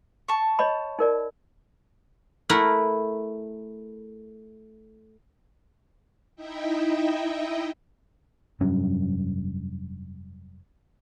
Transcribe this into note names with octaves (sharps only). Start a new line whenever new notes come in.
A5 C#6
C#5 D#5 B5
D#4 A#4 D5
A3 E4 A#4 F#5
D#4 E4 D#5 E5 G5
F1 G2 F#3 C#4